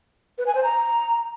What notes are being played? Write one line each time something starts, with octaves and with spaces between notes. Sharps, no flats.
B4
G#5
C5
A#5